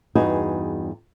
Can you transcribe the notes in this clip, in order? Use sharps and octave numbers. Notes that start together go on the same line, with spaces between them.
E2 G2 D#4 F#4 G#4